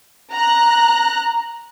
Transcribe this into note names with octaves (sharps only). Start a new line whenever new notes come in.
A#5 F#6